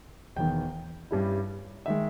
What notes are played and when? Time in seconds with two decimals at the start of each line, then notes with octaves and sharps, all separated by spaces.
0.36 E1 E2 D#3 G5
1.11 G2 G3 C#4 E4
1.86 D#3 G#3 E5